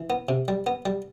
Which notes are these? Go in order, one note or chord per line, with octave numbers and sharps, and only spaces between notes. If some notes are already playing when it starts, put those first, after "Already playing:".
Already playing: E3
B3
C3
G3
B3
G3